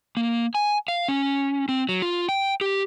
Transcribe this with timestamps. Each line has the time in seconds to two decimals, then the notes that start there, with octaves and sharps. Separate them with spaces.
0.17 A#3
0.55 G#5
0.88 F5
1.08 C#4
1.69 C4
1.89 F#3
2.02 F4
2.29 G5
2.61 G4